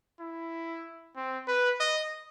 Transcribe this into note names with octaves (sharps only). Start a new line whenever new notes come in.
E4
C4
B4
D#5